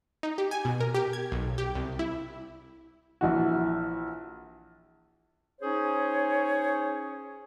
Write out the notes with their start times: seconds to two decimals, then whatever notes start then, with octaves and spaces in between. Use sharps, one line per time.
0.23 D#4
0.38 G4
0.51 G#5
0.65 B2
0.81 A#4
0.94 G4
1.13 G#6
1.32 B1
1.58 G4
1.75 C2
1.99 E4
3.21 A#1 E3 F#4
5.61 C#4 D#4 G#4 C5 C#5